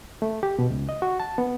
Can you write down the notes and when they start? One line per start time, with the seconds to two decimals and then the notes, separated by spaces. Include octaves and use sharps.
0.22 A3
0.43 G4
0.59 B2
0.70 C#2
0.89 D#5
1.02 F#4
1.20 A5
1.38 B3